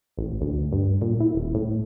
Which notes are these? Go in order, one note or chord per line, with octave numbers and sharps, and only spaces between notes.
A1
D2
G2
A#2
E4
D#1
A2